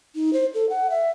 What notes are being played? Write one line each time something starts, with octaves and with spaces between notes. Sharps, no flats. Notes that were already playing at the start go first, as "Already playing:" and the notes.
D#4
C5
A4
F#5
E5